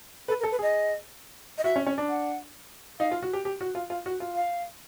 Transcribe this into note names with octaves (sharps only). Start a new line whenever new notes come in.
A4 B4
A#4
A4
B4
G#4 D#5
D#5
F#4 E5
C#4
C#4
D4
F#5
D#4 F5
F4
F#4
G4
G4
F#4
F4
F4
F#4
F4
F5